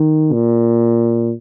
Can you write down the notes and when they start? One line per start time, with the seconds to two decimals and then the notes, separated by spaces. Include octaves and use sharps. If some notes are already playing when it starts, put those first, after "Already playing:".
Already playing: D#3
0.33 A#2